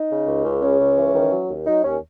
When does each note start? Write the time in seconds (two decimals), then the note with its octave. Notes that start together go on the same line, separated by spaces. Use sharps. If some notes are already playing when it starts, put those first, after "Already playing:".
Already playing: D#4
0.11 C#3
0.27 C#2
0.45 C#2
0.62 C#3 C#4
0.80 C#2
0.97 E3
1.14 D#3
1.32 F#3
1.49 D#2
1.66 F#3 D#4
1.83 D#2 C#4